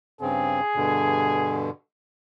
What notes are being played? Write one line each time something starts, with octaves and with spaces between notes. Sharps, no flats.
G2 C#3 C4 G#4
G2 B2 D3